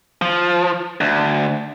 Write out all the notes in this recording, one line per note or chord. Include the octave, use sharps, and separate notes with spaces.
F3
D2